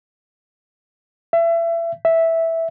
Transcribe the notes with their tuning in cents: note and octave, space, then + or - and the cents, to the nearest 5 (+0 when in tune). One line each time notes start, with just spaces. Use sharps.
E5 +30
E5 -5